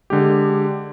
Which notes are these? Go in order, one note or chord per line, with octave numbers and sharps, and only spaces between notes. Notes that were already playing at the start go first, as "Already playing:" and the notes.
D3 G#3 G4